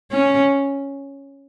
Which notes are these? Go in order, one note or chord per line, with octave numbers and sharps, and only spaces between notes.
C#4